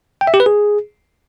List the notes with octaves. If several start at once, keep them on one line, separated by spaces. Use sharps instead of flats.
G5
E5
G4
B4
G#4